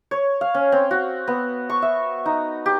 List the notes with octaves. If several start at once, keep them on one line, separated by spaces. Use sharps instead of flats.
C#5
F5
C#4
C4
F#4
B3
C#6
E5
D#4
G4